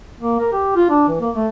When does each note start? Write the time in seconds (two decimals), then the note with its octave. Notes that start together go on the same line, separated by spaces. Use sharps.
0.21 A#3
0.39 A#4
0.53 G4
0.76 F4
0.90 D4
1.08 E3
1.20 A#3
1.35 A3